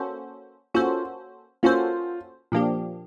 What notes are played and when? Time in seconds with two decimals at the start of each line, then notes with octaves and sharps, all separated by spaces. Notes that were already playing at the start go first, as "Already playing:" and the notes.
Already playing: A#3 C#4 F#4 A4 C5
0.74 A#3 C#4 F4 F#4 A4 C5
1.63 A#3 C#4 F4 F#4 A4 C5
2.52 A#2 F3 A#3 D4 G4